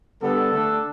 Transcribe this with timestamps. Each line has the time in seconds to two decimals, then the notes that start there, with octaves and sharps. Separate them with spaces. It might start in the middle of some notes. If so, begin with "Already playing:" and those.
0.22 D3 G3 B3 D4 A4
0.51 D3 A3 D4